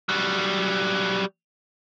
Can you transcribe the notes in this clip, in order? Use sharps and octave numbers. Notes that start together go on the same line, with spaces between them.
F#3 G3